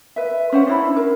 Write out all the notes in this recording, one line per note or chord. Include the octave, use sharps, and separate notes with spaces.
B4 E5
C#4 C5 F#5
D4 E4 B5
A#4